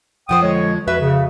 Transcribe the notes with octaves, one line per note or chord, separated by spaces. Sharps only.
F2 F3 C5 F#5 G5 D#6
D3 G#3 C#5
F2 F#4 B4 E5
C#3